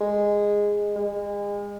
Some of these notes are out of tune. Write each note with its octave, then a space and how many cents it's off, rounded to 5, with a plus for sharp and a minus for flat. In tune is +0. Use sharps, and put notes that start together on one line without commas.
G#3 -10
G#3 -35